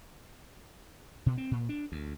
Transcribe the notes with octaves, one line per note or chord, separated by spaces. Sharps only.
B2
C4
A#2
D4
D2